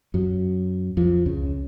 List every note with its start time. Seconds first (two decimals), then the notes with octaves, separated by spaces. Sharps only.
0.14 F#2 F#3
0.97 F2 F3
1.26 C#2 C#3